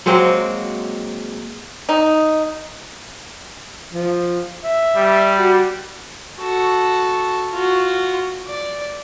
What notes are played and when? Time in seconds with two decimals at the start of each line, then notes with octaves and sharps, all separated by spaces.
0.06 F#3 G#3 A#3 C4
1.89 D#4
3.93 F3
4.64 E5
4.96 G3
5.38 F#4
6.39 F#4 A4
7.52 F4 F#4
8.47 D5